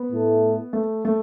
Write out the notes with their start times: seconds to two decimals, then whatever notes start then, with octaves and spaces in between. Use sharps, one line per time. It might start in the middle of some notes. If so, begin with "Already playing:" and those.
Already playing: B3
0.11 A2 A3 E4 A4
0.73 A3
1.05 A3